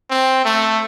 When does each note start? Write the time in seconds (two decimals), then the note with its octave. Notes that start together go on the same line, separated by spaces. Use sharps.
0.10 C4
0.45 A3